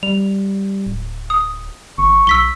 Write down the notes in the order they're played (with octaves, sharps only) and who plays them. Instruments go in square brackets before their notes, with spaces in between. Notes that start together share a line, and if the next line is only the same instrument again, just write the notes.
[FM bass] G3 [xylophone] F7
[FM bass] D1
[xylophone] D#6
[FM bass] G1 [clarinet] C#6
[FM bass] B1 [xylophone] E6 B6 G7